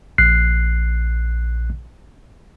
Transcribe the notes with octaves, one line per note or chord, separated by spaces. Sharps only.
A#1 F#6 C7